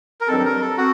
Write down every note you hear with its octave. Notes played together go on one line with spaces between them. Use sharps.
A#4
G2 D#3 F#3 C4 A4
A#4
A4
C4 F#4